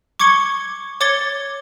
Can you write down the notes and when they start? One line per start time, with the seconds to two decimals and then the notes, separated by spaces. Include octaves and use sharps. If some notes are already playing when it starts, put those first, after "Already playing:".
0.20 C#6 D6 G#6 C#7 G7
1.01 C#5 D6 G#6 A6 C#7 G7